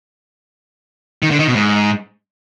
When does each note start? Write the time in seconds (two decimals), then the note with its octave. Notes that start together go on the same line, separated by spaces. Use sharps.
1.22 D#3
1.31 D3
1.39 D#3
1.47 B2
1.56 G#2